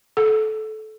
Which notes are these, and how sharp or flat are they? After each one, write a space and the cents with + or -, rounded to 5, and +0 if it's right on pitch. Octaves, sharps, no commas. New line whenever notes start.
A4 -20